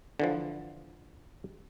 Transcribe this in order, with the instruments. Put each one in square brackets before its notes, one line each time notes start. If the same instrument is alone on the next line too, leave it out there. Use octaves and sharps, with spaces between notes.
[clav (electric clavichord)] D3 E3 F3